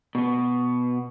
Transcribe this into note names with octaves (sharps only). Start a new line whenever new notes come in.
B2 B3